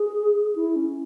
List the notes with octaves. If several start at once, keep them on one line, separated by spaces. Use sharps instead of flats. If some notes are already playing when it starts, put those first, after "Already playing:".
Already playing: G#4
E4
C#4